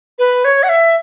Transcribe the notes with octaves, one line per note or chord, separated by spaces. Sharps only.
B4
C#5
F#5
E5